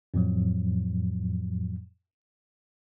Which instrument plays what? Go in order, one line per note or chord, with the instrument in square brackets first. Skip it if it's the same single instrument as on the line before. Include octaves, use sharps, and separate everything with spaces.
[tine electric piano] F2 A2 F3 F#3